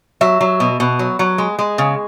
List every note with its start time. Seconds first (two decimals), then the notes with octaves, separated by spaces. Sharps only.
0.21 F#3 E5
0.41 F#3
0.60 B2
0.80 B2
0.99 F#3
1.19 F#3
1.38 G#3
1.59 G#3
1.78 C#3